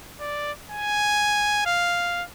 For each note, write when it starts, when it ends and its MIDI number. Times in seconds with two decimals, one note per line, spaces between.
0.21 0.52 74
0.71 1.62 80
1.66 2.23 77